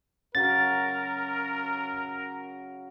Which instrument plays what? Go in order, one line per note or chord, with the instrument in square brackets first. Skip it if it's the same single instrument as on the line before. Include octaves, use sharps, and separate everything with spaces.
[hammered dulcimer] C#3 F#3 [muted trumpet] A#4 [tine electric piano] A6